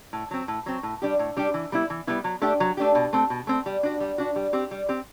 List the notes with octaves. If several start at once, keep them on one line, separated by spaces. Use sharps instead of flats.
A2
F#3 C4
A2
F#3 C4
A2
G3 D4 G4
A2
G3 D4 G4
E3
G3 B3 E4
E3
G3 B3 E4
F#3
A3 D4 G4
F#3
A3 D4 G4
B2
A3 C4
B2
A3 C4
G3
D4 F#4
G3
D4 F#4
G3
C4 G4
G3
C4 G4